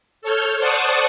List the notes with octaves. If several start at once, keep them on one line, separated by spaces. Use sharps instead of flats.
A4 C#5 F6 G6
C5 D5 F#5 A5 C#6 D#6